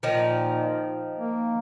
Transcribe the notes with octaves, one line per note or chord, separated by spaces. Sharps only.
A#2 D#3 F3
A#3